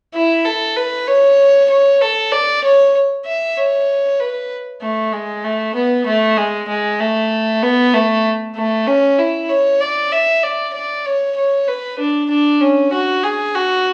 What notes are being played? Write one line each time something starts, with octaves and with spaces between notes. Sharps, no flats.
E4
A4
B4
C#5
C#5
A4
D5
C#5
E5
C#5
B4
A3
G#3
A3
B3
A3
G#3
G#3
A3
B3
A3
A3
C#4
E4
C#5
D5
E5
D5
D5
C#5
C#5
B4
D4
D4
C#4
F#4
G#4
F#4